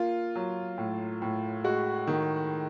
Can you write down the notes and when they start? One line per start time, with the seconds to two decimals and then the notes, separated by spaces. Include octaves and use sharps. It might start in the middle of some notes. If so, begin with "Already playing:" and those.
Already playing: A#3 F4
0.35 F#3
0.78 A2
1.22 A2
1.64 G#3 F#4
2.07 D#3